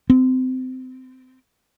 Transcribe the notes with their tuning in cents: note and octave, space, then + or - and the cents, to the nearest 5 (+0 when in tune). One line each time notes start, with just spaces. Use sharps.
C4 -25